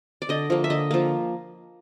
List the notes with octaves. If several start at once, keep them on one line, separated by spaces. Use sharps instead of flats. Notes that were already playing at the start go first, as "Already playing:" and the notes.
D5
D3 D#5
F3 A#3
E5
D3 D#5
F3 A#3